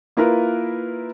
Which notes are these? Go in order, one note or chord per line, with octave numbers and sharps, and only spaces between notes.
A#3 E4 F4 A#4 B4